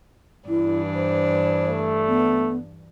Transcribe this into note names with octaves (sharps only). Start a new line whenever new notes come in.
G2 E3 D4 E4
C5
A3
B3